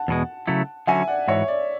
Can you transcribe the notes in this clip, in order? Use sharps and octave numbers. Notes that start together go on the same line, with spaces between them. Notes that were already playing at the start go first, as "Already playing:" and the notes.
Already playing: F#5 A5
E2 B2 G#3
C#3 F#3 A3 E4
D3 F#3 C#4 F#4 E5 G#5
D5 F#5
G#2 E3 F#4 C#5 E5
D5